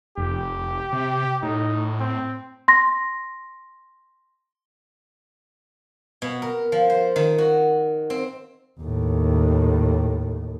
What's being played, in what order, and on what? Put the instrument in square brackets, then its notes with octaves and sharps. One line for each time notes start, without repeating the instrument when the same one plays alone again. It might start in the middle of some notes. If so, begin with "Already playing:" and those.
[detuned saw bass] F1 [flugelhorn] G4
[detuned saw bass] C3
[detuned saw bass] A2 [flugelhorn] D#4
[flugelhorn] C4
[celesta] C6 A#6
[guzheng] B2
A#4
F3
C5
D#3
F#4
C4
[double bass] D#2 A2